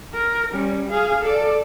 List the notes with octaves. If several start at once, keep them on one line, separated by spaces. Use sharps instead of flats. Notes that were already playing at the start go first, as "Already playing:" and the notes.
A#4
G3 C#4
G#4 F5
A4 D5